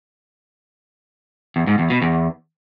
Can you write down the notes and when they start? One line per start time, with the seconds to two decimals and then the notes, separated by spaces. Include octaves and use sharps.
1.56 E2
1.67 G#2
1.79 E2
1.90 B2
2.02 E2